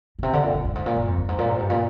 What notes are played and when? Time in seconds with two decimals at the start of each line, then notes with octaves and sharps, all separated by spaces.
0.19 A#2
0.23 C3
0.33 D3
0.44 A#2
0.54 A#2
0.65 G2
0.75 G#2
0.86 A#2
0.96 G2
1.07 F2
1.18 G2
1.29 G#2
1.38 A#2
1.49 G#2
1.59 G2
1.70 A#2